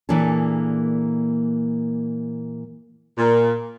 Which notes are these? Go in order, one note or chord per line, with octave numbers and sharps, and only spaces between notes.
A#2 E3 A#3 D4 G#4 A4
A#2